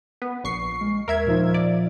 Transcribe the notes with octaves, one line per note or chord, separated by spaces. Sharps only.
B3
A#1 C#6 C7
G#3
D#2 A#4 E5 G#6
A#2 F3 D#4
D5